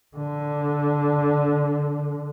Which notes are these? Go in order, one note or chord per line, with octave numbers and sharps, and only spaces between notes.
D3